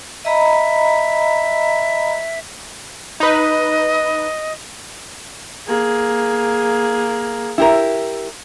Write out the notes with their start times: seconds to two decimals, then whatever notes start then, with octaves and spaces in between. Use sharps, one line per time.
0.25 D#5 E5 A#5 B5
3.20 D#4 B4 D#5
5.67 A#3 G#4
7.58 E4 G4 A#4